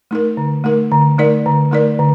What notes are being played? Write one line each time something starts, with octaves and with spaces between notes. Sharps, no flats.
A3 D#4 A#4
D3
A3 D#4 A#4
D3
A3 D#4 A#4 D5
D3
A3 D#4 A#4 D5
D3